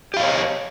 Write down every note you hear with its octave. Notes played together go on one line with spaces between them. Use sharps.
G4 C#5 D#5 F5